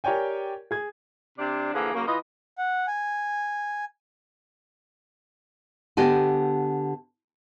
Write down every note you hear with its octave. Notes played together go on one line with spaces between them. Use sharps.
G4 A#4 C#5 D5 G5 G#5
G#4 G#6
C3 D4
D3 E3 F3 A#3 G#4
C#3 F#3 A#3
E3 F4 D#5
F#5
G#5
D3 B3 G4 D#5 G#5 A5